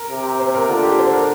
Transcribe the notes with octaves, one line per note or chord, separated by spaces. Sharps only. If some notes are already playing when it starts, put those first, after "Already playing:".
Already playing: A#4
C3
C5
A#4
D3 F4
G4
C5
A#4